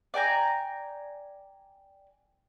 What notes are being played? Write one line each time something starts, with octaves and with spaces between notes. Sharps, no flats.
D5 G5 G#5 A#5